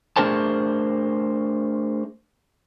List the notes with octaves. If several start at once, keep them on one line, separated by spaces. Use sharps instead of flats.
A3 D4 G#4 A#4 C5 A5